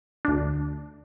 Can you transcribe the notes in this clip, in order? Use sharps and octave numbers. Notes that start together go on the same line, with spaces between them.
D2 D4